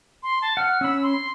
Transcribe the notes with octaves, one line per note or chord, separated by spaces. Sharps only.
C6
A5
F#5 F6
C#4 B5 E6
C6